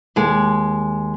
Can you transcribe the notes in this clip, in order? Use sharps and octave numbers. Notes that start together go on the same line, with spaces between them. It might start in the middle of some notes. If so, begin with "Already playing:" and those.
D#2 G#3